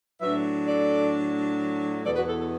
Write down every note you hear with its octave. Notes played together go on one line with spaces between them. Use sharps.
A2 F#3 D4 B4 E5
A4 D5
E2 B2 B3 E4 A4 D5
F#4 B4
A4
A4